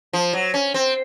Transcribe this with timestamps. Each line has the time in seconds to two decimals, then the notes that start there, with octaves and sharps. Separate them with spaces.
0.13 F3
0.33 F#3
0.54 C#4
0.74 C4